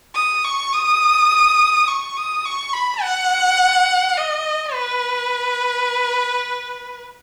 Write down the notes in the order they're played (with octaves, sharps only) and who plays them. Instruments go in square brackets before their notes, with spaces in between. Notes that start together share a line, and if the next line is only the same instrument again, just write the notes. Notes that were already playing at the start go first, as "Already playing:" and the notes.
[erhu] D#6
C#6
D#6
C#6
D#6
C#6
B5
F#5
D#5
B4